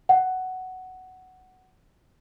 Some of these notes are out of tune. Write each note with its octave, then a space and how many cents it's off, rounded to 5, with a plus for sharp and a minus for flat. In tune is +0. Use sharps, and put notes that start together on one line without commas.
F#5 +10